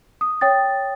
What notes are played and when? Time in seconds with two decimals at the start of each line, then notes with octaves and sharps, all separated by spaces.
0.21 D#6
0.41 C#5 G5 D#6 A6